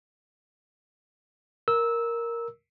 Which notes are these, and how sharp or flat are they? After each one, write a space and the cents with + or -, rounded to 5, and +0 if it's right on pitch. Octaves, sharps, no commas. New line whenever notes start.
A#4 +0 E6 -15